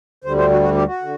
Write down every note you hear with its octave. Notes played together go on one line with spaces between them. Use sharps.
D2 D3 G3 C5
C5
F#4
F#4
G4
F#4
D3